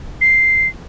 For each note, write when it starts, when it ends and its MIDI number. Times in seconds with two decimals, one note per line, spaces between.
0.21 0.68 96